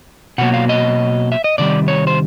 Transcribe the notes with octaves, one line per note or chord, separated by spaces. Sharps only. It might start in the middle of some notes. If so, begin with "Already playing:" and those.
B2 F#3 A#3 F#5
F5
D#5
E5
D#5
C3 D#3 G3 D5
C#5
C5